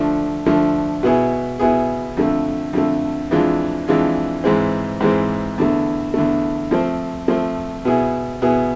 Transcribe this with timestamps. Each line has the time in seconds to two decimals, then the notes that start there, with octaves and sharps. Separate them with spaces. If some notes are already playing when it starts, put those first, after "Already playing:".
Already playing: D3 F3 A3 D4
0.46 D3 F3 A3 D4
1.03 B2 B3 E4 G#4
1.59 B2 B3 E4 G#4
2.17 F2 D3 A3
2.73 F2 D3 A3
3.31 F2 E3 G#3 D4 F4
3.88 F2 E3 G#3 D4 F4
4.44 G#2 E3 G#3 C4
5.00 G#2 E3 G#3 C4
5.58 E2 D3 A3
6.14 E2 D3 A3
6.71 F3 A3 C4
7.28 F3 A3 C4
7.85 B2 B3 E4 G#4
8.41 B2 B3 E4 G#4